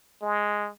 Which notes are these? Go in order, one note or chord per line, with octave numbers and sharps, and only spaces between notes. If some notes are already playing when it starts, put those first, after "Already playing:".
G#3